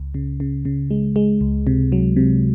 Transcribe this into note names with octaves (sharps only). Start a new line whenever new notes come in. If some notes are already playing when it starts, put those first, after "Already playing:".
Already playing: C#2
C#3
C#3
C#3
G#3
G#3
C#2
C3
F#3
C3